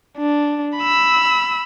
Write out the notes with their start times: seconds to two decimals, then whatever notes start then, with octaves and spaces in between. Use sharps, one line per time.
0.18 D4
0.78 B5 E6